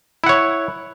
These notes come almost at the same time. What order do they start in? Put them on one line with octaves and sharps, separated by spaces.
E4 F#5 C#5